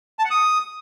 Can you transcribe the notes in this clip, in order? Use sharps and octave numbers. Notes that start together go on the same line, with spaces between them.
A5
F#5
D#6